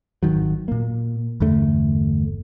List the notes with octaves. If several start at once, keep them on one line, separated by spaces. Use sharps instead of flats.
G#1 D#3 F#3
A#2 A#3
G1 E2 D3 A3